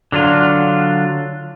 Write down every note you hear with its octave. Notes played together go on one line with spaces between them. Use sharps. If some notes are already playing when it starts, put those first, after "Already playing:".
D3 F#3 D4 F4